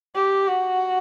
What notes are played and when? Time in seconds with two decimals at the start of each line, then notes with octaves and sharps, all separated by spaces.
0.15 G4
0.48 F#4